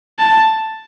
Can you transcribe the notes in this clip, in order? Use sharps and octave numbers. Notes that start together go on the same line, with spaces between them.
A5